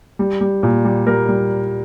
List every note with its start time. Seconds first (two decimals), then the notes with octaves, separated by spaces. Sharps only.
0.19 G3
0.41 G3
0.63 A#2
0.85 G3
1.07 G3 A#4
1.28 G3